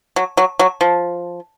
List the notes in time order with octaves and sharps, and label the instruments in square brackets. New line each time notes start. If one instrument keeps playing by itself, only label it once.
[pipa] F#3
F#3
F#3
F3